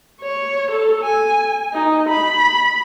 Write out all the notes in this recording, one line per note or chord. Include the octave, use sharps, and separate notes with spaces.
C#5
A4
G#5
D#4
B5